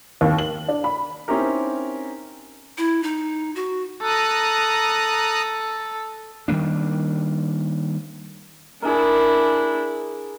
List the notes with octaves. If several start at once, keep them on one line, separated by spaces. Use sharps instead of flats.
D#2
F#7
D4
B5
C4 C#4 D#4 E4 G4 A#4
E4
D#4
F#4
A4 A#5 D#6 F#6
D#3 G3 A#3 D4
D4 E4 G#4 A#4